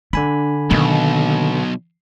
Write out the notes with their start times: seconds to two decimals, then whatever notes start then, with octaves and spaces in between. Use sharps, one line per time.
0.13 D3 D4 G#5 B5
0.71 B1 B2 D#3 A#3